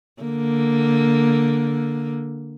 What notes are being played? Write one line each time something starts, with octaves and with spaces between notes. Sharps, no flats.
D3 A#3